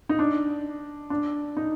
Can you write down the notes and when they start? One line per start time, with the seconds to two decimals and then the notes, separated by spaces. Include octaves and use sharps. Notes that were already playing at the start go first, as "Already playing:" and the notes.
0.09 D#4
0.19 D4
1.10 D4
1.57 D#4